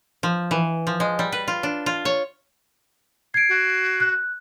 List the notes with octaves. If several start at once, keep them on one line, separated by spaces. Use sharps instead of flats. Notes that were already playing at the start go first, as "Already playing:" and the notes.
F3
E3
F3
G#3
G3
B4
F4
D4
F4
C#5
G#6 C7 D7
F#4
F#6